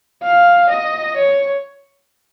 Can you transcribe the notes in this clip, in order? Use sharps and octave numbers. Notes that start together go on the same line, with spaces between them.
F5
D#5
C#5